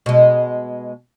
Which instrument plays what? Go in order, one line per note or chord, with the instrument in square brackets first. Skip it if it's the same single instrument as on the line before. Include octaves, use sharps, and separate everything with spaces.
[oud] B2 G#3